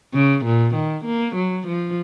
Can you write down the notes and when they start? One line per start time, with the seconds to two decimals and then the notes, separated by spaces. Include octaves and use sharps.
0.14 C#3
0.45 A#2
0.75 D#3
1.05 A#3
1.35 F#3
1.67 F3